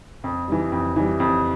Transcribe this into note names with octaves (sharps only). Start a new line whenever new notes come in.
F2
E3 G3
F2
E3 G3
F2